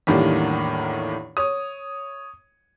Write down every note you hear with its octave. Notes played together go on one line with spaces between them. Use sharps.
E2 A2 D#3 G3 A#3 D4
C#5 D#6